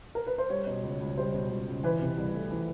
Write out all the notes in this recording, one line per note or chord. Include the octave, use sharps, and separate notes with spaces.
A#4
B4
C5
G3 C#5
B2
C#2
C#2
G3 C5
B2
C#2
C#2
E3 B4
C3
C2
A3
E3